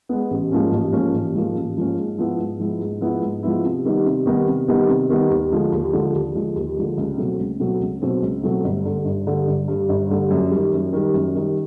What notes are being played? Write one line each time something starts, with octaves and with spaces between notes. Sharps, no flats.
G#3 B3
A1
G#2 F3 A#3 C#4
A1
G#2 F3 A#3 C#4
A1
G#2 F3 A#3 C#4
A1
G#2 F3 A#3 C#4
G#2
F3 G#3 B3 E4
G#2
F3 G#3 B3 E4
G#2
F3 G#3 B3 E4
G#2
F3 G#3 B3 E4
C3
D#3 G3 B3 D#4
C3
D#3 G3 B3 D#4
C3
D#3 G3 B3 D#4
C3
D#3 G3 B3 D#4
D#2
D3 F3 G#3
D#2
D3 F3 G#3
D#2
D3 F3 G#3
D#2
D3 F3 G#3
C#2
B2 F#3 A3 C4
C#2
B2 F#3 A3 C4
C#2
B2 F#3 A3 C4
C#2
B2 F#3 A3 C4
G1
G2 D3
G1
G2 D3
G1
G2 D3
G1
G2 D3
F#2
G3
D#3
F#2
D#3 G3
F#2
D#3 G3